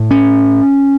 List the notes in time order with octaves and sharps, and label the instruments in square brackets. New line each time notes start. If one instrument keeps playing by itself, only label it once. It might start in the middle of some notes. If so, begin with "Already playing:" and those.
Already playing: [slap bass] A2
C#4